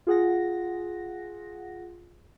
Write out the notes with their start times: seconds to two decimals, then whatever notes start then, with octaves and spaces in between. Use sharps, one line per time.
0.07 F4 G#4 F#5 A#6